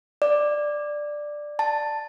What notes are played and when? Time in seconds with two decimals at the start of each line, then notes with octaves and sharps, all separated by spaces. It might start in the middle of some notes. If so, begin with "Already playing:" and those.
0.22 D5
1.59 A5